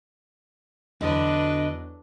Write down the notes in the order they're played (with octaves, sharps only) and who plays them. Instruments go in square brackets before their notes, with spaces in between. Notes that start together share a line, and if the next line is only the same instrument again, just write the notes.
[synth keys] E2 F#3 [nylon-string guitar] D3 [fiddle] D4 B4 [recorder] D#5